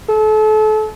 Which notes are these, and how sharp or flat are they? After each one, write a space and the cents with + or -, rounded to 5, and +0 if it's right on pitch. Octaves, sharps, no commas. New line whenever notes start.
A4 -35